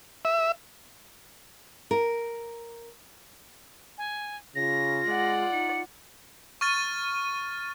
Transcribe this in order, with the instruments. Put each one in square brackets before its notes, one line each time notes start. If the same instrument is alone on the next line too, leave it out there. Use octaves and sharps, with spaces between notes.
[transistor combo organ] E5
[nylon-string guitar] A#4
[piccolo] G#5
[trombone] C#3 [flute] F4 [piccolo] A#6
[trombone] G#3 [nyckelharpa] D5 F#5
[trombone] D#4 [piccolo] C#7
[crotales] C#6 F6 A6 D#7